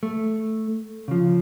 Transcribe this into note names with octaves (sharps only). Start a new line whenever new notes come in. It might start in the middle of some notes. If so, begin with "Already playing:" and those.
A3
C#3 F3